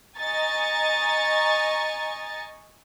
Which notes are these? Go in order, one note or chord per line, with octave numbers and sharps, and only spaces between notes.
D#5 G#5 A#5 C#6 A6